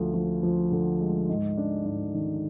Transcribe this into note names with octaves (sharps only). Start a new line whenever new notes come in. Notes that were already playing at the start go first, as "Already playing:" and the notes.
Already playing: D2 F3
F3
F3
D3
G#3
G#2
D4
G#2
D#3